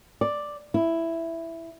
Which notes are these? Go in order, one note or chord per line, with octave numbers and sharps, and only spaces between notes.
D5
E4